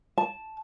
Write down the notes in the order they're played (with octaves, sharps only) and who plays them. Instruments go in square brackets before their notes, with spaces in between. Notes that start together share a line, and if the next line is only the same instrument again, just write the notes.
[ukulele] A5